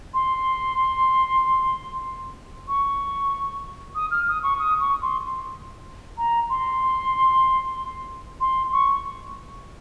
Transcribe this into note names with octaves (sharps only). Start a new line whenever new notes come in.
C6
C#6
D#6
F6
D#6
C#6
D#6
C#6
C6
A#5
C6
C6
C#6